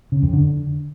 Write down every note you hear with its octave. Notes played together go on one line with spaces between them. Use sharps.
C#3
F2
D3